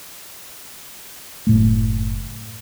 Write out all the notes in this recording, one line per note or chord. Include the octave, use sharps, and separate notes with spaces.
F#1 A2 A3